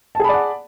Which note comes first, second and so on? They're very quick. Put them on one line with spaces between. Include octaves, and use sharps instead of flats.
A5 G#4 B5 D5 F#5